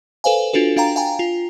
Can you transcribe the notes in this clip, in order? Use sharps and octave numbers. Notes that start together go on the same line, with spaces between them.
A4 B4 C5 F5 G#5
D4 F4 F#4 A4
D4 F5 G5 A#5
F5 G5 G#5 A#5
F4